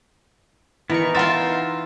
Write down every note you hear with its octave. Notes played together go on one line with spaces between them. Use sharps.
E3 B3 D#4 A#4 C#6
F4 E5 F#5 C6 A6